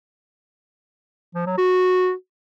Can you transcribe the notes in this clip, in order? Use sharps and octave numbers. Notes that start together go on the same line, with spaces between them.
F3
F#3
F#4